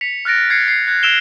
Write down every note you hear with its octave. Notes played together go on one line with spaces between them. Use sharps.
B6 C#7 F7
F6 F#6 A6 A#6 D7
G#6 A6 C7 C#7
C7
F#6 G#6
E6 F#6 D7 E7 F7 G7